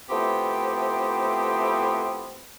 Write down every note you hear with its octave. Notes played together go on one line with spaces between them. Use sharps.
F3 A3 B3 C4 E4 G4